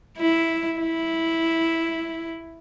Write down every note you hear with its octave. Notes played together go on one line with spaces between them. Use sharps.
E4
E4